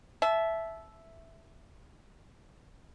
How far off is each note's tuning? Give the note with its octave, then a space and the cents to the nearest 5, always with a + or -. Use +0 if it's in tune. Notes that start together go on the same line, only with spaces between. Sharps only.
E5 +0 A5 -25